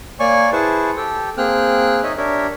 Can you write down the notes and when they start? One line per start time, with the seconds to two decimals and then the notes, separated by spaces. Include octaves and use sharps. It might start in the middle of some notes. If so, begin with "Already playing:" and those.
0.20 A#3 C#5 D5 G#5 C#6
0.52 E4 G#4 B4 C5 A5 C#6
0.97 G4 A4 G5
1.38 A#3 C4 G#4 G5 F6 F#6
2.03 D#4 C#5 D#5 E5
2.17 D4 G4 A#4 C#5 E5